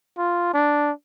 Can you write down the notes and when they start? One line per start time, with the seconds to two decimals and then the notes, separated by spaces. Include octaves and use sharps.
0.18 F4
0.54 D4